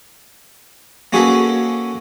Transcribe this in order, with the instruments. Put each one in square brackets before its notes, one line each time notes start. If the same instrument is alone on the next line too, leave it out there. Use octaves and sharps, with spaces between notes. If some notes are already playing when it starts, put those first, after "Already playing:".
[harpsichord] A#3 C#4 F#4 G#4 A4 B4